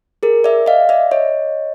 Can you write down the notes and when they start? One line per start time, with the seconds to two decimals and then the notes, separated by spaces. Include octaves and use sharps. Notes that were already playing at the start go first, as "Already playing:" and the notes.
0.23 G#4 A#4
0.44 D5 E5
0.66 D#5 F5
0.89 D5 E5
1.11 C#5 D#5